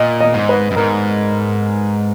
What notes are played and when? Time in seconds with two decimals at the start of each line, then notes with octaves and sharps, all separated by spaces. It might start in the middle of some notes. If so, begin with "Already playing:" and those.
Already playing: A#2 D#5
0.21 D#5
0.34 G#2
0.49 B4
0.71 F#2
0.76 G#2 A#4